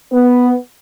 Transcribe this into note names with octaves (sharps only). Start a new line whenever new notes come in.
B3